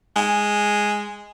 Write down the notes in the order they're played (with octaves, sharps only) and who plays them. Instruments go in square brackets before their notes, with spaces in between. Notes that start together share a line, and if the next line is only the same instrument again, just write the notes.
[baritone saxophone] G#3